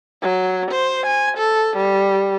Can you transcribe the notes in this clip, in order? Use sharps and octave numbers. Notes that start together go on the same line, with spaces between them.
F#3
C5
G#5
A4
G3